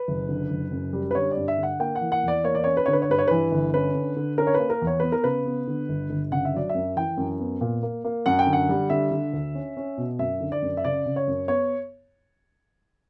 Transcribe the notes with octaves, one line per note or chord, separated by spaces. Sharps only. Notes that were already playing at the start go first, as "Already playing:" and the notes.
Already playing: B4
F#1
D3
F#1
F#2
G3
B4
D3 C#5
D5
G2
E5
D3
F#5
A#3 G5
F#5
E3
F#5
E2 D5
A#3 C#5
D5
C#4 C#5
B4
D3 C#5
B4
C#5
G2 B4
C#5
E3 B4
G1
C#4 B4
D3
D3
C#4 A#4
C#5
A#3 B4
A#4
E2
C#5
B3 B4
A#4
C#3 B4
B3
D3
G1
G1
C#3 F#5
E5
F#3 D5
E5
F#2
E3 G5
F#2
B3
A#2
A#3
A#3
F#2 F#5
G5
D3
F#5
G3
D3 E5
D3
D2
C#4
C#4
B2
F#2 E5
D3
D5
F#2
E5
C#3 D5
C#3
C#5
F#2
B3 C#5